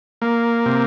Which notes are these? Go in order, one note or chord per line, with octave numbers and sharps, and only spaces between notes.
A#3
C3